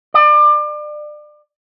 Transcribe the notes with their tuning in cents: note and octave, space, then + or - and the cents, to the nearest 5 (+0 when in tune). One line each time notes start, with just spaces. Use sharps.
D5 +30